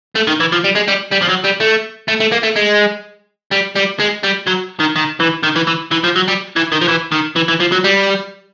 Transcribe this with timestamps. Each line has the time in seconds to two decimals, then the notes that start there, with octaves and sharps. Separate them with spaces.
0.16 A3
0.27 D#3
0.40 E3
0.52 F3
0.64 G3
0.75 G#3
0.88 G3
1.11 G3
1.22 F3
1.28 F#3
1.44 G3
1.60 A3
2.08 A3
2.20 A3
2.32 A#3
2.43 A3
2.56 G#3
3.52 G3
3.76 G3
4.00 G#3
4.24 G3
4.47 F#3
4.80 D#3
4.96 D#3
5.20 E3
5.43 D#3
5.56 E3
5.67 E3
5.92 E3
6.04 F3
6.16 F#3
6.28 G3
6.56 E3
6.72 D#3
6.81 F3
6.88 E3
7.12 D#3
7.36 E3
7.48 E3
7.60 F3
7.72 F#3
7.84 G3